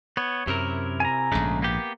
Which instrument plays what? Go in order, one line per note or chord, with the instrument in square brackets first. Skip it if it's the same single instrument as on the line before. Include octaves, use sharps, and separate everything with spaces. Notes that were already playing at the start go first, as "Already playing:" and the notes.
[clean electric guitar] B3 [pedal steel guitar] C#5
[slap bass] F#2 [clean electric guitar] C3 E4 A#4
[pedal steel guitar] G#5 A#5
[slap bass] A#1 G#2 [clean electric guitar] C#3 G#3 A3
[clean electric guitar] A#3 B3 G4